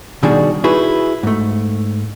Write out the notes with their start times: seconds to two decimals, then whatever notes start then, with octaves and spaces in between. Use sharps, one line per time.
0.23 B2 D#3 G3 D4 F#4 G#4
0.64 D#4 E4 F#4 G#4 B4
1.23 G#2 A3